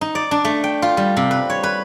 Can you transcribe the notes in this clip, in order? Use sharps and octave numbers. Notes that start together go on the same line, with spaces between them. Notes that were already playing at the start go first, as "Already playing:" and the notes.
D#4
D5
D4
A3
G5
F4
G3
C3
B4
C#5
B4